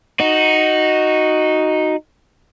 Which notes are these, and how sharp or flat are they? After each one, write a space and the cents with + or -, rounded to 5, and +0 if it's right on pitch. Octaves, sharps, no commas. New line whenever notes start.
D#4 +0 F#4 +0